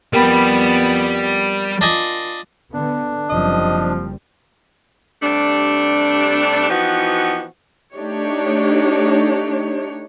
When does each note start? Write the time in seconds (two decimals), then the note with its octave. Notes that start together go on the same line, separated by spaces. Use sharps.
0.13 F2 G3 B3 A#4 G5 B5
1.81 D4 F4 D#5 G#5
2.74 D3 B3 D4
3.29 F#1 F3 G3 C4 D#5
5.23 C3 G3 A3 D4
6.69 E3 F3 B3 C4 D#4 F#4
7.93 A3 D4 D#4 G4 C#5